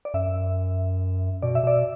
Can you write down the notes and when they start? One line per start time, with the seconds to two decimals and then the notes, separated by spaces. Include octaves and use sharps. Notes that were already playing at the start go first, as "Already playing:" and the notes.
0.05 D5
0.14 F#2 E5
1.42 B2 D5
1.55 E5
1.63 B2 D5